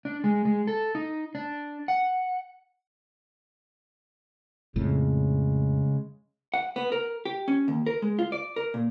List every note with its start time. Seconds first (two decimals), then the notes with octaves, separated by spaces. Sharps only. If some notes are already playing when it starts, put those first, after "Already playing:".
0.05 D4
0.24 G#3
0.45 G#3
0.67 A4
0.95 D#4
1.35 D4
1.88 F#5
4.76 F2 A2 C#3 G#3
6.54 F#5
6.76 B3
6.92 A#4
7.25 G4
7.48 C#4
7.68 D#2
7.86 A#4
8.02 G#3
8.19 F4
8.32 D5
8.56 A#4
8.74 A#2